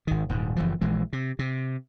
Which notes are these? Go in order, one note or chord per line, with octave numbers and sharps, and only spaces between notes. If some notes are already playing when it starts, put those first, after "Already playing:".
G#1 D#3
D#1 G#2
F#1 E3 F3
A#1 E3 G#3
C3
C3